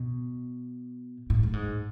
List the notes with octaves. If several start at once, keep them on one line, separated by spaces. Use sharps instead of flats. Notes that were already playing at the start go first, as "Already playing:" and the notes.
Already playing: B2
A2
A2
G#2